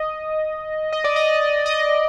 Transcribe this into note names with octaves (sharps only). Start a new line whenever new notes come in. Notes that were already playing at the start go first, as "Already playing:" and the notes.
Already playing: D#5
D#5
D5
D#5
D#5